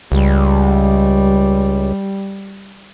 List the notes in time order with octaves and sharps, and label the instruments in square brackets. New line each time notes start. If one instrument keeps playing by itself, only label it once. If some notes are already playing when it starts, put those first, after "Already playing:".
[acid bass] C#2 [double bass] G3